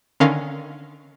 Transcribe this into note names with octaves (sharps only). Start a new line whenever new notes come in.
D3 D#3 C#4 A#4 F5